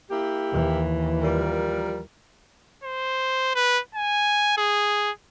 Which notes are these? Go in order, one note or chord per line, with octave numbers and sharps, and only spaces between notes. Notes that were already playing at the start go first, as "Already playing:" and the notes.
A#3 E4 G4
D#2 E3
F3 G3 A#4
C5
B4
G#5
G#4